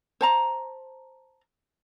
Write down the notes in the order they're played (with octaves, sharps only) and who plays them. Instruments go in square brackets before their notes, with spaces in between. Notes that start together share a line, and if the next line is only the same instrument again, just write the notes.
[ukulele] C5 A5 A#5